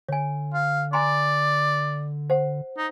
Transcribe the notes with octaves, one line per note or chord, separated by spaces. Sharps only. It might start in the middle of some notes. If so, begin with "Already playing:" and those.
D3 C#5 G#5
F5
D5 G#5 A#5 C6
C5 F#5
D#4